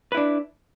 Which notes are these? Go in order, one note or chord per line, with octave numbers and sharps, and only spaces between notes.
D4 E4 B4